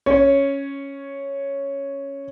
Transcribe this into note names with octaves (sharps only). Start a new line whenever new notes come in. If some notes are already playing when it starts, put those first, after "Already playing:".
C#4 C#5